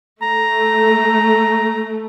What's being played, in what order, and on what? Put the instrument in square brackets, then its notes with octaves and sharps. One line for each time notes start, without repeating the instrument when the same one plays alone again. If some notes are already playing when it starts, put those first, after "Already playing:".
[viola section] A3 [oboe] A#5